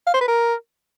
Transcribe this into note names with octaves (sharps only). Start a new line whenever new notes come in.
F5
C5
B4
A#4